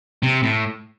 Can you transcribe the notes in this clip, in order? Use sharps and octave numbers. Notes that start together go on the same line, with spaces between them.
C3
A2